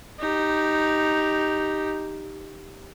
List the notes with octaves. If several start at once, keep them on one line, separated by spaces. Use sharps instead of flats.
D#4 G4